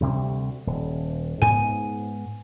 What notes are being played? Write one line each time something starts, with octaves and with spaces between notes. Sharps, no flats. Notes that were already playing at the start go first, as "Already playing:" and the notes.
D2 C3 G3
D#1
G#2 B3 G#5